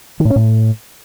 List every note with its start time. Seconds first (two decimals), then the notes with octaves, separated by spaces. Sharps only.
0.20 D#3
0.25 A2
0.30 C#4
0.36 A2